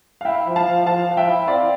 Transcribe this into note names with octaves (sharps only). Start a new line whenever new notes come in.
F5
E4 E5 G5
F3
F5 A5
F3
F3 F5 A5
F3 F5
E5 G5
E4
C4 D5 F5